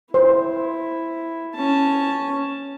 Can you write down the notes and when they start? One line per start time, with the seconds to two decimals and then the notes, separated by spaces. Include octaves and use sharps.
0.14 E4 C5
1.55 C#4 A5